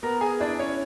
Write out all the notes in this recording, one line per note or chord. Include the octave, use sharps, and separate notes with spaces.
B3 A#4 A#5
G#4 G#5
D4 E4 D5
C#4 C#5